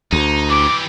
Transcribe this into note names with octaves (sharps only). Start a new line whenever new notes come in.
D2 D#4
E3 G4 D6